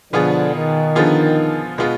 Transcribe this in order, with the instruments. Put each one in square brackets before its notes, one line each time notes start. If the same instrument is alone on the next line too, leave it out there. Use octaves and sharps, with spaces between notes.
[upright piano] B2 B3 F4 G#4 [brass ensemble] D3 F3
[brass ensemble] D#3
[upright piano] D3 F3 B3 F4 G#4
B2 G#3 B3 F4